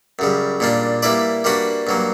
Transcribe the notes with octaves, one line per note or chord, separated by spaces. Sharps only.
F#2 C#3 G3
A#2 G3 A#3 D4
G3 A#3 E4 B4 D5
G3 A#3 D4 F#4 B4
G2 F#3 A#3